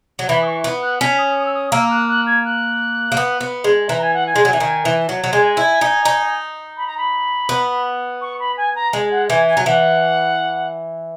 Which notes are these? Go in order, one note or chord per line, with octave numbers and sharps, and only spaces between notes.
F#3
E3 B5
D#6
C#6
B3
F#6
C#4 B6
D#6
D#6
E6
D#6
A#3 E6
F#6
F#6
G#6
F#6
A#3
B3
B3
G#3
E3 A#5
G#5
F#5
G#5
G#3
F#3
E3
D#3
E3
F#3
F#3
G#3 G#5
E4
D#4
D#4
B5
A#5
B5
B3
C#6
B5
G#5
A#5
G#3
F#5
E3 G#5
G#5
F#3
E3 F#5